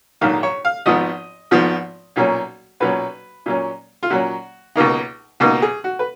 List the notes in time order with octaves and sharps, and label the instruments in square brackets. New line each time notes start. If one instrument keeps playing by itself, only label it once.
[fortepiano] A#1 G#2 D#3 F#3 F5
C#5
F5
G#1 G#2 F3 B3 D#5
G#1 G#2 F3 B3
B1 A#2 F#3 C#4
B1 A#2 F#3 C#4 B4
A#2 F#3 C#4
F4
A#2 F#3 C#4 F#4
C#2 B2 A#3 D#4
C#2 B2 A#3 D#4
G#4
F#4
B4